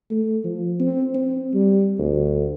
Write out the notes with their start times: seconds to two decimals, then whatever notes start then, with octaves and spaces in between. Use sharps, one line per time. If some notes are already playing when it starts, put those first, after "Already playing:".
0.11 A3
0.44 F3
0.80 C4
1.15 C4
1.54 G3
1.99 D2